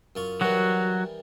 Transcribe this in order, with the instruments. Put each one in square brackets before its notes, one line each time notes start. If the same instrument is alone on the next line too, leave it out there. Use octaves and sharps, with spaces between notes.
[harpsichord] F#2 F4 C#6
[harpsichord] D#3 E3 G3 [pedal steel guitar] F#3 F#4